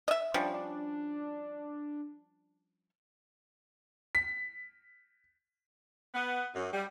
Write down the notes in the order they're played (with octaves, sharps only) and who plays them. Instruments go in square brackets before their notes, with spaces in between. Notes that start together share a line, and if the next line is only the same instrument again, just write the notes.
[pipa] D#5 E5
[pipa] F3 G3 C#4 [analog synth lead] D4
[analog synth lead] D4
[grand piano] B6
[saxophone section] B3
F#2
G3